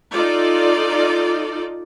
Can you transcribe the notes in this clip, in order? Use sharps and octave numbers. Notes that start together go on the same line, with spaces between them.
D#4 F4 A4 D5